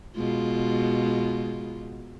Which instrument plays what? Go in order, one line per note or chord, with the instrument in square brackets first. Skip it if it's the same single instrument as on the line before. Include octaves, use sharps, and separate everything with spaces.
[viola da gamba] B2 G#3 F4